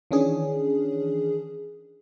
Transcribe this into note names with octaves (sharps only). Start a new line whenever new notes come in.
D#3 E3 C#4 D4 G#4